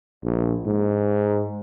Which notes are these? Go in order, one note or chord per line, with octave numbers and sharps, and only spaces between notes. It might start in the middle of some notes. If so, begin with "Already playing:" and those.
A#1
G#2